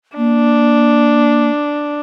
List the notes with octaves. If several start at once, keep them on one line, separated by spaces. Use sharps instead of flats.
A#3 D4